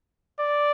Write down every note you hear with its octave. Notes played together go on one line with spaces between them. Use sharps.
D5